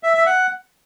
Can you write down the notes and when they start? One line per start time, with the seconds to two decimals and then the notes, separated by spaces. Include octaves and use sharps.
0.03 E5
0.15 E5
0.26 F#5